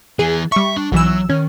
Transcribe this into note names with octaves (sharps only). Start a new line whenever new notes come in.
E3 B3 G#4
G3 E5 C#6
D4
B1 E3 F#3 E6
D#3 C#4